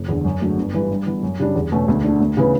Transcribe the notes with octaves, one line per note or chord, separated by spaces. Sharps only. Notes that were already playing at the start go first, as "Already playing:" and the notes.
Already playing: F#1
E2 D3
F#2
D3 F#3 A3
G1
G2 E3 G3
G2
E3 B3
F#2
C#3 G3 D4
E2
B2 A3 C#4
D2
D3 A3 D4
D2
C#3 E3 B3